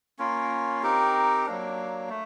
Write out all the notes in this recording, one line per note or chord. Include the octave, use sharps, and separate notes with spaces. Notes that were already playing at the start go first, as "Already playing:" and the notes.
A#3 C#4 F4 A#4
C4 D#4 G4 A#4
F#3 A#3 D4
A3